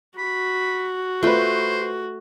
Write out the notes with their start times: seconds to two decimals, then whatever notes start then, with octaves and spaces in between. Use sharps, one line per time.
0.18 F#4 B5
1.23 A3 F4 B4 C5 G5